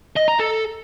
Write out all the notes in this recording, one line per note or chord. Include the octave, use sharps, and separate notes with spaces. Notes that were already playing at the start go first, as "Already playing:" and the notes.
D#5
A#5
A4